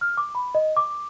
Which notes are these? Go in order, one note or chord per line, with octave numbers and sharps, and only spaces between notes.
F6
D6
B5
D#5
D6